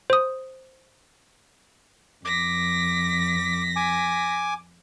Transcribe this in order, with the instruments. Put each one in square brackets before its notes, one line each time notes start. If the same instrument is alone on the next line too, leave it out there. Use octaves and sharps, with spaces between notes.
[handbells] C5 D#6
[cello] F2 [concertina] D6 [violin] A#6 B6
[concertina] G#5 D6